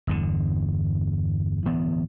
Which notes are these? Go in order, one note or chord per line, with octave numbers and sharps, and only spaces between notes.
G1 E2 D3
D1 G2 E3 B3